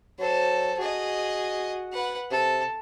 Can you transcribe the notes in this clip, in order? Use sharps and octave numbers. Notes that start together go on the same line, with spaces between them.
F#3 A4 C5
F#4 G#4 D#5
B4 F#5
C3 A4